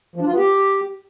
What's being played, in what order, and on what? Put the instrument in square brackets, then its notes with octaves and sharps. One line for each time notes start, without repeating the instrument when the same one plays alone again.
[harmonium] F3
D4
F4
B3
G4